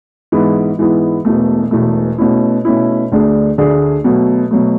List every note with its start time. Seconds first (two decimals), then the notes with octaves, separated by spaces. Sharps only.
0.32 G#2 E3 G#3 B3 E4
0.78 G#2 E3 G#3 B3 E4
1.25 E1 E2 B2 A3
1.71 E1 E2 B2 A3
2.18 B2 A3 C#4 E4
2.65 B2 A3 C#4 E4
3.12 D2 D3 A3 D4 G#4
3.58 D2 D3 A3 D4 G#4
4.04 B2 F#3 A3
4.51 B2 F#3 A3